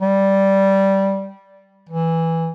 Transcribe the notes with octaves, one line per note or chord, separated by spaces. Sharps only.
G3
E3